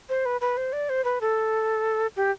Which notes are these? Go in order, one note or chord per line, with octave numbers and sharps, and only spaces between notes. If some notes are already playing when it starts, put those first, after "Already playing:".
C5
B4
B4
C5
D5
C5
B4
A4
G4